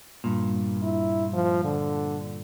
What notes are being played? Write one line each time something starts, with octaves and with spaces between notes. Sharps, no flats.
G2 A#2
E4
F3
D3